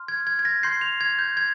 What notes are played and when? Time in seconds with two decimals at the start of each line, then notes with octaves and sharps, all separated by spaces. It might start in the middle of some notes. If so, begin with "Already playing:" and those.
Already playing: C6 F6
0.08 G#6
0.27 G#6
0.39 G#6
0.45 A#6
0.63 C6 G6 C7
0.81 F7
1.01 G#6
1.19 G6
1.37 G#6